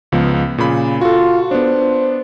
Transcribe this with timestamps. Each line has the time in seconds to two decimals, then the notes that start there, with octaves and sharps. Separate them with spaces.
0.12 C#2 F3 B3
0.58 A#2 C#3 B5
1.01 F4 F#4 A4
1.51 B3 D4 C5